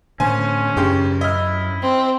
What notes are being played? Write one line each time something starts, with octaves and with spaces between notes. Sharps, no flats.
A2 D3 C#4 C5 G#5
F#2 C#3 D4 G4 C6
E4 D#5 F6
C4